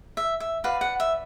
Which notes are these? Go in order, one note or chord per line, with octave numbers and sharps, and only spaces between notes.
E5
E5
F#4 B4 D5 F5
F#5
E5